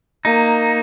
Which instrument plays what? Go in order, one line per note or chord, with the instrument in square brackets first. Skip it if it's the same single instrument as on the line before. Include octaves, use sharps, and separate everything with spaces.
[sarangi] A#3 [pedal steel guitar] D#4